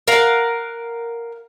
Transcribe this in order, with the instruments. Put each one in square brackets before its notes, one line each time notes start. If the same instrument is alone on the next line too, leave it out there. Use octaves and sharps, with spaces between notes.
[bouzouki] A#4 F5 F#5